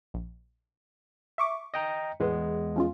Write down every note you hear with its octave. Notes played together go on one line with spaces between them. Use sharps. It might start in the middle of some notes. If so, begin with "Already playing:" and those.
A#1
E5 C#6 D6
D#5 G5 A#5
E2 A2 E3 G#3 B3
F3 C#4 F4